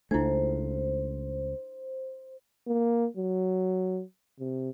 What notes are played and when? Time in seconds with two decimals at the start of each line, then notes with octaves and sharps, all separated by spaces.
0.11 C#2 A3 D4 E4 C5
2.67 A#3
3.17 F#3
4.40 C3